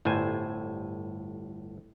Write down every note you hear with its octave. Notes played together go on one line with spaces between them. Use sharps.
G1 A2 G3 C5 G#5